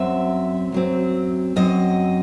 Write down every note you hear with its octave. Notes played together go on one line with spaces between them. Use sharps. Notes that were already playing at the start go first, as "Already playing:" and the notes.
Already playing: F#2 F#3 C4 E5
F#2 F#3 C4
F#2 F#3 C4 D#5